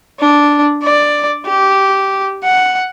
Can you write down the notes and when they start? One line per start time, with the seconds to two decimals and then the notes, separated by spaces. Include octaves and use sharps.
0.20 D4
0.83 D5
1.46 G4
2.44 F#5